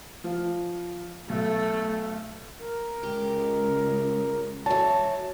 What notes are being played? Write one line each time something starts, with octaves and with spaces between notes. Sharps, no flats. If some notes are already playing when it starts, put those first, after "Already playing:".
F3 F5
B1 A3
A#4
C#2 G4
E3 F#3 A5